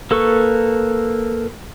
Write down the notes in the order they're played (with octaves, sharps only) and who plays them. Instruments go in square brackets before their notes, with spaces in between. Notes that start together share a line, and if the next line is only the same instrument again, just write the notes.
[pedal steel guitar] A#3 A4 B4 C#6